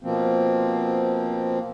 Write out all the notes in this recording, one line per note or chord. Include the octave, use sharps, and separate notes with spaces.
B2 F3 A#3 C4